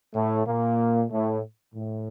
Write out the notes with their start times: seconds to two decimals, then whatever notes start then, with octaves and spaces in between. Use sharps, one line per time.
0.14 A2 A3
0.46 A#2 A#3
1.10 A2 A3
1.74 A2